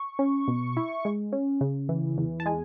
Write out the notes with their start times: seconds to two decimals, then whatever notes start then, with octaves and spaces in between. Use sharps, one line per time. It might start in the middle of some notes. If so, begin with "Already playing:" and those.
Already playing: C#6
0.19 C#4
0.48 B2
0.77 E4
1.05 G#3
1.33 C#4
1.61 C#3
1.89 E3
2.18 E2
2.40 A5
2.46 G#3 G#5